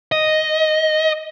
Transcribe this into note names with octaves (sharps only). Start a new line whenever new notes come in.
D#5